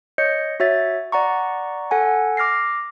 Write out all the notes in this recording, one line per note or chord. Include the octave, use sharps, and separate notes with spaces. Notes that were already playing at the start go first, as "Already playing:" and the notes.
C#5 D#5 G6 C#7
F#4 C#5 E5 A6
D5 F#5 A#5 C#6
A4 F#5 G#5
D6 F6 A#6 C7